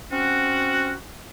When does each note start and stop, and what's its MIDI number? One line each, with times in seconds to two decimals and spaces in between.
0.11 0.92 60
0.11 0.92 61
0.11 0.92 66